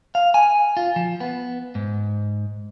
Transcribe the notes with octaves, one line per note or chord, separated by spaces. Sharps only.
F5
G#5
F4
F3
B3
G#2